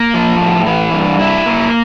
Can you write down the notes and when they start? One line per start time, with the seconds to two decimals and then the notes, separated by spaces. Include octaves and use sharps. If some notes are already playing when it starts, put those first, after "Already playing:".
Already playing: A#3
0.14 F3
0.41 A2
0.66 E3
0.94 G2
1.19 E4
1.46 A#3